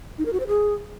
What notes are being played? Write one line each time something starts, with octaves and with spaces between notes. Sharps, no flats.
D#4
A#4
F#4
C5
G#4